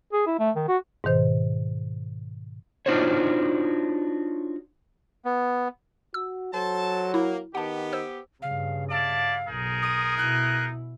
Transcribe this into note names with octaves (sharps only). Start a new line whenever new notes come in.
G#4
E4
A3
D#3
F#4
G#2 B2 D#3 C5
D4 D#4 F4 F#4 C5 C#5
B3
F#4 E6
F#3 A4 C5 A5
A#3 E4
D#3 B3 G4 F#5 A5
C5 E6
G2 C#3 F5
E4 D5 F5 A5
B1 D#4 G#4 A#4
D#6
B2 E4 F#6